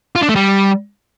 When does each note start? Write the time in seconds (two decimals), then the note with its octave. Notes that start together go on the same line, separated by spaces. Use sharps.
0.15 F4
0.22 D4
0.29 A3
0.36 G3